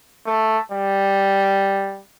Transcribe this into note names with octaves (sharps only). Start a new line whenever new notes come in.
A3
G3